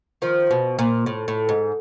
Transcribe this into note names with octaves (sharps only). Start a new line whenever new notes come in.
D#3 F3
B2
A#2
A2
A2
G#2